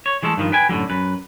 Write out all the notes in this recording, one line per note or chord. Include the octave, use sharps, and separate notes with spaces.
C#5
E3 G#3 A3 A4
G2 D#3 F3
B4 G5 G#5
F#2 A2 D3 F#3
F#2 B4